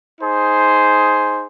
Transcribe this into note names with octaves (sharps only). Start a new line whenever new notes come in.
D#4 G#4 C5 C6